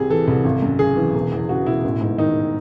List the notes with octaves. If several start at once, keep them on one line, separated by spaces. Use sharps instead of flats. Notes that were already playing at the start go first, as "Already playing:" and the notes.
Already playing: C2 C3 G#4
E3 A4
C2
G#1
F#2
C#3 G#4
E3
E1
E2
C#3 F#4
E1 E4
A1
G#2
D#3 D#4